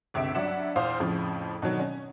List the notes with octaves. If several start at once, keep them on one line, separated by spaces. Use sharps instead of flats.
G1 C#2 C3 E5 D7
G2 F#3 D5 E5 F#5 E7
E2 A#2 C5 F5 D#6 F6
F2 A2 C#3 F3
B2 D3 D#3 F#3
C#4